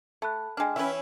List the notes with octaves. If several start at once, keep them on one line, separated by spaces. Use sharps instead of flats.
A3 A5 B5 F#6
G#3 D4 G5 F6
E3 C#4 E4 B4 E5